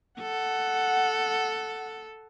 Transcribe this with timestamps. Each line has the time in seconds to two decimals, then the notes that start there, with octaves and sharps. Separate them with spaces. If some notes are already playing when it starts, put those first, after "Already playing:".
0.21 A4 F#5